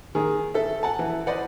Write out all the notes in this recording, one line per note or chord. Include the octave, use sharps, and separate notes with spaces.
D#3 G#4
A4 E5
F#5 G#5 A5
E3
B4 C5 D5 D#5 F#5